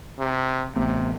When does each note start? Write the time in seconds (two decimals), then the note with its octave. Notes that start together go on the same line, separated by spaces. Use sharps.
0.19 C3
0.76 A1 C3 A3 B3